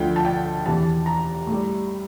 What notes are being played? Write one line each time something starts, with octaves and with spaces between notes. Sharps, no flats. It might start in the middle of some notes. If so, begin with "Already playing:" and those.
Already playing: D2 D3 F3 G5
A5
G5
E2 C3 E3 A5
A#5
A2
G3